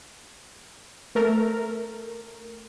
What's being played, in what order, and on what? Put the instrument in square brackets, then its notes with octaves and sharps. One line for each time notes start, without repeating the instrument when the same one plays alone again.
[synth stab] A3 A#4